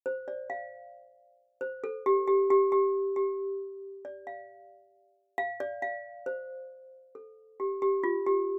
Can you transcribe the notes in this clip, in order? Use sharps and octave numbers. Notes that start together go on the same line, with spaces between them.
C5
D5
F5
C5
A4
G4
G4
G4
G4
G4
D5
F5
F5
D5
F5
C5
A4
G4
G4
F4
G4